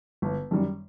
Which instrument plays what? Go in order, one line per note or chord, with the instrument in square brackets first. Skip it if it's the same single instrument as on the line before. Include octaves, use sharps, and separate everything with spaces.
[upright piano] G1
F#2 D#3 G3